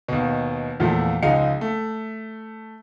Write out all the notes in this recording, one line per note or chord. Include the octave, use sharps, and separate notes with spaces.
D#2 B2
E2 A#2 F3 A3
C#2 F3 G#3 D#4 F5 C#7
A3